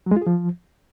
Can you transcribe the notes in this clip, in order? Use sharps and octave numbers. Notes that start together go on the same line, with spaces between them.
F#3
G#3
F4
G#4
F3